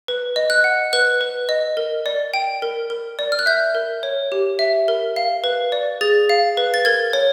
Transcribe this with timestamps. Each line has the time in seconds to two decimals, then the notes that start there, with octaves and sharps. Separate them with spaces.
0.08 B4
0.36 D#5
0.50 F#6
0.64 F#5
0.93 B4 F#6
1.21 B4
1.49 D#5
1.77 A#4
2.06 D5
2.34 G5
2.62 A#4
2.90 A#4
3.19 D5
3.32 F6
3.39 F#6
3.46 E5 G6
3.75 A#4
4.03 C#5
4.32 G4
4.59 E5
4.88 A#4
5.16 F5
5.44 B4
5.72 D5
6.01 G#4 A6
6.29 F5
6.57 B4
6.74 A6
6.85 A#4 G#6
7.13 C#5